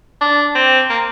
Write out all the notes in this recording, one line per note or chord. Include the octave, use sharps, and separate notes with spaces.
D4
C4
A#3